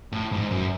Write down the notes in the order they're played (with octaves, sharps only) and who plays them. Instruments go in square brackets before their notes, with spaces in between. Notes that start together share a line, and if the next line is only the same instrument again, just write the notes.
[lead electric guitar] A2
G#2
F#2